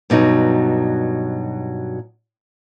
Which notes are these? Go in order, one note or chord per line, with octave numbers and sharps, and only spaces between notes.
G2 B2 F#3 D#4